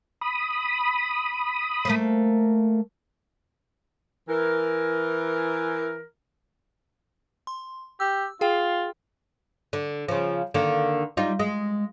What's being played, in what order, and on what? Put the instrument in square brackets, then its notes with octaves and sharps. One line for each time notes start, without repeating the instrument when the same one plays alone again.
[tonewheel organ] B5 D#6
[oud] A3 A#3 C5
[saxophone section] E3 A#4
[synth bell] C6
[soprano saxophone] G4 [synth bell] E6
[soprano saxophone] F4 [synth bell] G#4 G5
[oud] D3
C#3 F3
D3 D#3 A#3
G3 D#4 F4
G#3